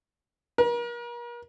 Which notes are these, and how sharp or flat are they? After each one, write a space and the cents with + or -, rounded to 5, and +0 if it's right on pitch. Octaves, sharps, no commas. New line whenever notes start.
A#4 +40